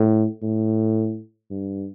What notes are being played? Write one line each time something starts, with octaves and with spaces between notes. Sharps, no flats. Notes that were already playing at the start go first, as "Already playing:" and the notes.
Already playing: A2
A2
G2